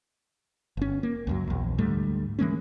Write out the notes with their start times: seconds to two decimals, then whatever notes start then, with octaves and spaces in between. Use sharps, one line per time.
0.77 G1 C#4
1.03 A#3
1.27 C#2 F#2 F#3
1.47 A#1 E2
1.78 D2 G#2 G3 A3
2.39 E3 G#3 A#3 C#4